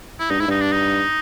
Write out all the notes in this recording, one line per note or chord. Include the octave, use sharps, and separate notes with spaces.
E4
G2 D#4
G#2 E4
G2 D#4
D4
D#4